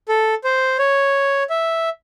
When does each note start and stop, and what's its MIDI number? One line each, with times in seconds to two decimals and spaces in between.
0.09 0.35 69
0.44 0.77 72
0.79 1.43 73
1.50 1.89 76